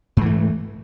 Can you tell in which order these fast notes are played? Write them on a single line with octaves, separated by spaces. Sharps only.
G#2 E3 A3